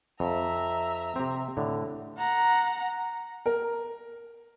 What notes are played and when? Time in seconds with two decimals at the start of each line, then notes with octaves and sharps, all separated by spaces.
0.20 F2 E5 A#5
1.16 C3 C4
1.57 A2 D3
2.18 F#5 A#5
3.46 A#4